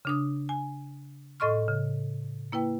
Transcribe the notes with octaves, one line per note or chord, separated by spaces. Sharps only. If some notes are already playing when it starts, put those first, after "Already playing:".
C#3 D4 D#6
G#5
A2 A4 D#5 C6 C#6 F6
C#3
A#3 E4 B4 G5